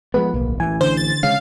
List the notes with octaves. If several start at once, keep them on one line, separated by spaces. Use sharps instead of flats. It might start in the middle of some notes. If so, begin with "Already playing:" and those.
F3 G#3 B3 B4
D1 B1 A#3
A1 E3 G#5
D3 C5
A6
C#3 G#3 C#4 F5